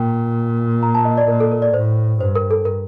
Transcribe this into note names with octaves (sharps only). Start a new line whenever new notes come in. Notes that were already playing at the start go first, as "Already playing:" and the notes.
Already playing: A#2 G5
A#5
A5
D#5
D5
A#2 A#4
A4
A#4
D5
A2 C5
G2 C5
A#4
A4
A#4